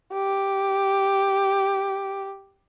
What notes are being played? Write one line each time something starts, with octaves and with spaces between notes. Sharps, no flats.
G4